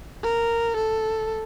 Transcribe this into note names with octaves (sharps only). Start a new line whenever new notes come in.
A#4
A4